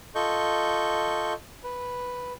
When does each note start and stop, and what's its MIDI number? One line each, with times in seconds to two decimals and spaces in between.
0.15 1.33 65
0.15 1.33 69
0.15 1.33 75
0.15 1.33 85
0.15 1.33 91
1.64 2.33 71